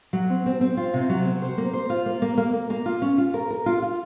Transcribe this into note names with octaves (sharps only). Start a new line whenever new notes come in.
F#3
C4
C4
C4
F4
C3
F#3
C4
C5
A#3
C5
F4
A#3
A#3
A#3
A#3
A#3
F4
C#4
F4
A#4
A#4
F4
F4